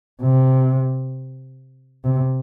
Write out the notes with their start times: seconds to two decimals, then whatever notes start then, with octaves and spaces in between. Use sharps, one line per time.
0.23 C3
2.05 C3